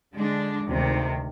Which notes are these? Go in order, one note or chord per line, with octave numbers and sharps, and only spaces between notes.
D3 G#3 D4
D2 C3 D#3